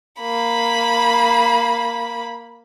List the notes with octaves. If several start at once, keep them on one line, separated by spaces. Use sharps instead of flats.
A#3 B5